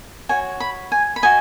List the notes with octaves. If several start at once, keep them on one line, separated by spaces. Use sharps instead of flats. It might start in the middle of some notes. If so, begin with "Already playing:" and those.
F#4 C#5 G#5
B5
G#5
B5
F#4 D#5 G#5